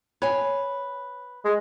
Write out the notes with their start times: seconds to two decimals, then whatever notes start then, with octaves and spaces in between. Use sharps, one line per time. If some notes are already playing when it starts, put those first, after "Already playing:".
0.22 B4 C#5 G#5
1.45 G#3